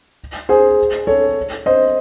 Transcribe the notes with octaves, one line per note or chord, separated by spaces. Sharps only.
G#4 C5
A4 C#5
C5 D#5